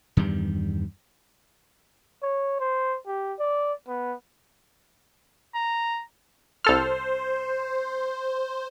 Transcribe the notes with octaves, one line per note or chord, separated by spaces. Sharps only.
E2 G2 D#3 G3
C#5
C5
G4
D5
B3
A#5
C2 A4 C5 F6